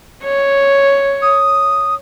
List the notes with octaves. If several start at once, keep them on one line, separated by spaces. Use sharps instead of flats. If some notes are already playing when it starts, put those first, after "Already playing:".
C#5
D#6